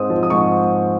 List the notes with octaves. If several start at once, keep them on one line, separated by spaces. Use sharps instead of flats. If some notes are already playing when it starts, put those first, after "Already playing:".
Already playing: G#2 G#3 C4 D#6
F3
D#6
G#2 C#6